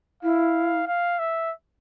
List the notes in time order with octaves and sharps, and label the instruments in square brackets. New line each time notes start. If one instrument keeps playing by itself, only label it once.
[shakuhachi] E4 [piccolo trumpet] F5
[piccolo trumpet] F5
E5